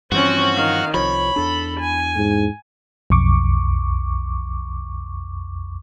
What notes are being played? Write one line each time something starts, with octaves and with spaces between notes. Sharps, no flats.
G2 E3 F3 C4 C#4 F#4
D#3 F5
C2 F3 C#5 B5
E2 D4 A4
G#5
G#2
B1 F2 C#6 D6